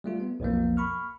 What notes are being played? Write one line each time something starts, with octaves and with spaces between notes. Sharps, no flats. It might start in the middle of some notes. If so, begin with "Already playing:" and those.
G3 A3 F4
B3
B1 F2 F3 A#3
B5 C#6 F6